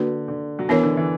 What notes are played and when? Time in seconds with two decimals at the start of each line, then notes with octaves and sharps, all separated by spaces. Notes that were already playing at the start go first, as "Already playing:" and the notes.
Already playing: D3 A#3 D4 F#4 B4
0.28 D3
0.59 F#3
0.69 E3 B3 D4 A#4 C#5
0.83 D3
0.97 E3